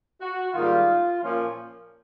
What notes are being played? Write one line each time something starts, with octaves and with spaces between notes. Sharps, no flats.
F#4
G#2 D#3 G3 A#3 F4
A#2 F3 A#3 C#4 F4